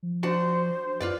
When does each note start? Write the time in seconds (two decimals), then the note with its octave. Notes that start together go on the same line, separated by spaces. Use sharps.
0.03 F3
0.23 D4 F#4 C5 A5
1.01 F#2 F4 B4 D5